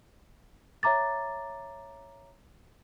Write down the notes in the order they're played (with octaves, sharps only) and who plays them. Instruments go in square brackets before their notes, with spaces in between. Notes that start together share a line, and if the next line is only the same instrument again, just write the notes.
[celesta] C#5 E5 A#5 D6 A6